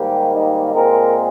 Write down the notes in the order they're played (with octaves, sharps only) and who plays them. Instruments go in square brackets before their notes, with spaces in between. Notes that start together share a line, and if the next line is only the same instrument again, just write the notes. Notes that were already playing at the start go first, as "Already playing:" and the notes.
Already playing: [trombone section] G#2 D#3 G3 A#3 G4
D#4
A#2 G#3 C4 A#4